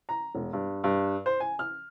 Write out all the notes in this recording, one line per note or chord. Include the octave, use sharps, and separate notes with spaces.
A#5
E1
G2
G2
C5
G#5
F6